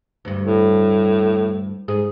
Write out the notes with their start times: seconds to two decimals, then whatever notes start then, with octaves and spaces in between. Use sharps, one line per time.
0.25 D2 G2
0.44 A2
1.88 G#2 G#4